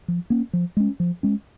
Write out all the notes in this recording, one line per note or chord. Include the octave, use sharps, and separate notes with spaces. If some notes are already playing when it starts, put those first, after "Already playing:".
F3
A#3 C#4
F3
G#3 C#4
F3
G#3 C#4